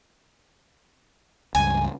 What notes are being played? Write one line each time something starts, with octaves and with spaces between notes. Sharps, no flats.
C#2 G2 G#5